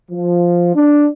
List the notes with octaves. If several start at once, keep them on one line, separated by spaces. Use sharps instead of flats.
F3
D4